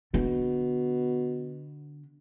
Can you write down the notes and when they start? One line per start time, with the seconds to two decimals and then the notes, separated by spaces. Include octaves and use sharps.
0.14 B2 D3